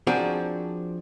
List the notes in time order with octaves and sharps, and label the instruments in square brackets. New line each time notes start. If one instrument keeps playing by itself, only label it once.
[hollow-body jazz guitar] F3 C4 D4 F#4 G#4 A#4